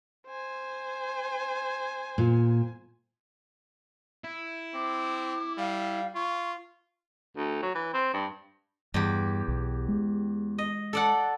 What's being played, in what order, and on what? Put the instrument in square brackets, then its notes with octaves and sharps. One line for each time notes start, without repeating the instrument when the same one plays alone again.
[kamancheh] C5 G#5
[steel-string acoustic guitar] A#2
[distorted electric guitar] E4
[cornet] C4 [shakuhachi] D6
[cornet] G3 [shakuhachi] F5
[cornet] F4 [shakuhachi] C#6
[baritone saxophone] D2
F#3
E3
C4
G2
[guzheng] E2 G4 [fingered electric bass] G2
[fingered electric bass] B1
G#3
[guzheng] D#5
A4 D5 F#5